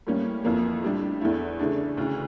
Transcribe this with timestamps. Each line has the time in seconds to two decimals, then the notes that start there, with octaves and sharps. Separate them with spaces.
0.07 A2 G3 A#3 C#4
0.45 F2 E3 A#3
0.83 A2 G3 D4
1.21 E2 E3 A3 E4
1.59 C#3 E3 A3 D4
1.97 D2 C#3 E3